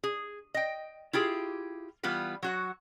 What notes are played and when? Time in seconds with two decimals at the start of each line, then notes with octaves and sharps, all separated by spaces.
0.04 G#4
0.54 D#5 G5
1.13 E4 F4 G4 G#4
2.03 E3 G3 B3 F4 B4
2.43 F#3 F#4 F#5